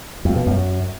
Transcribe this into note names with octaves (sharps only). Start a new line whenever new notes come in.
F2
B2
F#2